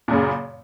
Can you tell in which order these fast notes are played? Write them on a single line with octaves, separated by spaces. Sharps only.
A#2 F#2 C#3